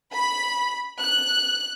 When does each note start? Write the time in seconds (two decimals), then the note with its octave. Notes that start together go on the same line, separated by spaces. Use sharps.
0.13 B5
1.01 F#6